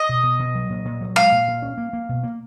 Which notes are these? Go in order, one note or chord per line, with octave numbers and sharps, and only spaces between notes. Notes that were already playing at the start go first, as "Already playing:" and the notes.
Already playing: D#5
B2
B2
B2
F#3
A#2
A#2
F#3
G#3 F5
A#2
A#2
C#4
A#3
A#3
B2
A#3